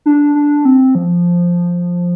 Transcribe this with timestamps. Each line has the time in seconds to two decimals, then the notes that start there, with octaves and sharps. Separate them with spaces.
0.06 D4
0.35 D4
0.65 C4
0.95 F3